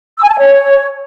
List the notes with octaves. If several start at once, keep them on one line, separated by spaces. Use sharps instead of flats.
E6
G#5
A5
G#5
C#5